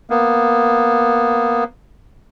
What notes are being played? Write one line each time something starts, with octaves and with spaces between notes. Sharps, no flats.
A#3 B3